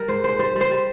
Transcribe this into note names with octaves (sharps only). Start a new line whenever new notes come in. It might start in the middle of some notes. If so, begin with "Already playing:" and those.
Already playing: G3 A#4
G#2 C5
G#2 C5
G3 C5
G3
C5
G3